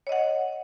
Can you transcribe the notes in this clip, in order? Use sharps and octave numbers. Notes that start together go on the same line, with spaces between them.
C#5 D#5 F#5